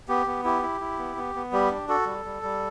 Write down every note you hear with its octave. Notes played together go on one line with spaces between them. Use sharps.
B3 G4
B3
E4 G4
E4
E4
B3
B3
B3
G3 G4
D4
F#4 A4
G3
G3
G3